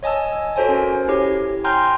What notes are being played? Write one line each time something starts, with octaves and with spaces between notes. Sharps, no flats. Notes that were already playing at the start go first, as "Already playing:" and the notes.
C#5 D#5 G#5 A5 E6
F#4 A4 C5 C#5 G#5
C#4 A#4
E4 G4 C#5
G5 G#5 A#5 C6 F6 G6